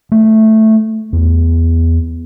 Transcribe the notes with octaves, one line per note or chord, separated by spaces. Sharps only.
A3
E2